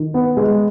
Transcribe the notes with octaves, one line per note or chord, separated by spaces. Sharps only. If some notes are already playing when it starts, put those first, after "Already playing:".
Already playing: D#3
B3
G#3